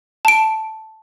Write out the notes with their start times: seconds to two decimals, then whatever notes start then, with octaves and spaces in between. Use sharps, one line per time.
0.25 A5 D7